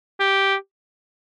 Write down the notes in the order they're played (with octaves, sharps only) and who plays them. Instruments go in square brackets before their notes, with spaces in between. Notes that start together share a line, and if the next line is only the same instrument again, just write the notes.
[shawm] G4